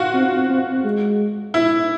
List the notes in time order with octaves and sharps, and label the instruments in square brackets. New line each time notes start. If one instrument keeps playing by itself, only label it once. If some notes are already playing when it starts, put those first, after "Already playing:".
Already playing: [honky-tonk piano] F4 F#4
[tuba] C4
C4
G#3
[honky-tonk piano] E4